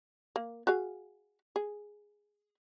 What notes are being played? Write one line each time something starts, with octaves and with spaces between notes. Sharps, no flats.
A#3
F#4 G#4 F5
G#4